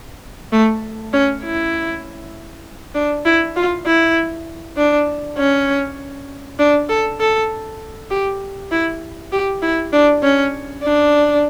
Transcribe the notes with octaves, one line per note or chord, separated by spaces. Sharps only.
A3
C#4
E4
D4
E4
F4
E4
D4
C#4
D4
A4
A4
G4
E4
G4
E4
D4
C#4
D4